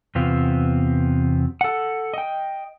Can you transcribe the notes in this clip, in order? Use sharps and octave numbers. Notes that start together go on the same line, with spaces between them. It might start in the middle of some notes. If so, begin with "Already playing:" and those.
E2 C3 B3 C4 F4
A4 F#5
D#5 G5